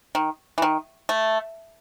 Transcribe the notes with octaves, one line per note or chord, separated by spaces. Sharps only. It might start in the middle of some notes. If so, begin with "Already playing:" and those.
D#3
E3
D#3
A3